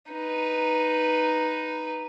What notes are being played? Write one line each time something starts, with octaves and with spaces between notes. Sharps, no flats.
D#4 B4